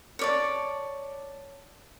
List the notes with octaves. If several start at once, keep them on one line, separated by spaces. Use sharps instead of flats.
C#5 D5 A5